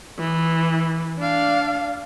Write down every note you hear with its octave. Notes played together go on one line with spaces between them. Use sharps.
E3
D4 F5